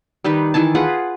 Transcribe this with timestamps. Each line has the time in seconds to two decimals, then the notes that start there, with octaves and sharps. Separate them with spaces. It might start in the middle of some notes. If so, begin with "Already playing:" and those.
0.24 D#3 G3 D#4 B4
0.54 D#3 E3 G#5 A5
0.75 F4 G#4 B4 F#5